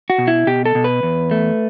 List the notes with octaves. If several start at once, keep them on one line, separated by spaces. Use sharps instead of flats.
F#4
B2
E4
B2 G4
A4
B2
B4
E2
A3